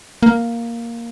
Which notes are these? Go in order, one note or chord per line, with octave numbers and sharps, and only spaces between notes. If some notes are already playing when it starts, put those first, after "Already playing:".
A#3